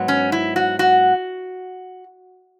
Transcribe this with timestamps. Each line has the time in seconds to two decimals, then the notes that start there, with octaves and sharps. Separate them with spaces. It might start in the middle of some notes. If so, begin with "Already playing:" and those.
Already playing: G#2 F#3 B3
0.08 C#4
0.32 E4
0.56 F#4
0.79 F#4